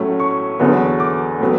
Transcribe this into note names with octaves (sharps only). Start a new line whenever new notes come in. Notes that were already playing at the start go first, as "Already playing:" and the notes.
Already playing: A2 F#3 A3 C#4
C#6
E2 D3 F#3 B3
D6
A2 F#3 B3